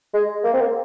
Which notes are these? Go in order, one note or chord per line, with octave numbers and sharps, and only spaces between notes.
G#3
A#3
C4
A#3